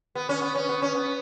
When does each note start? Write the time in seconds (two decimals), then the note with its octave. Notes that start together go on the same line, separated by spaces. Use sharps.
0.15 B3
0.29 C#4
0.42 B3
0.55 C#4
0.69 B3
0.82 C#4
0.95 B3